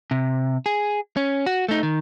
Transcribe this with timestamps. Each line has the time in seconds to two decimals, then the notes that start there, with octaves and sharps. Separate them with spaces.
0.11 C3
0.66 G#4
1.17 C#4
1.46 F#4
1.69 A3 D#4
1.83 D#3